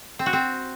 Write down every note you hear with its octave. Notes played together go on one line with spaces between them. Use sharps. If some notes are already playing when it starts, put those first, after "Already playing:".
C4
F#4
C4